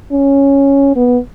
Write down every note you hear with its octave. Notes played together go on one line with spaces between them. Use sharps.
C#4
B3